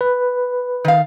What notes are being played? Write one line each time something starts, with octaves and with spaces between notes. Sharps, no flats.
B4
D#3 F5